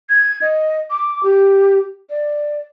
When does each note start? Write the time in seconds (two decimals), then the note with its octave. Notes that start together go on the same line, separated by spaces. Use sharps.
0.09 G#6
0.41 D#5
0.90 D6
1.23 G4
2.10 D5